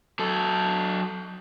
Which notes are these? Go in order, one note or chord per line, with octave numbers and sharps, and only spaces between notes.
F#3 A4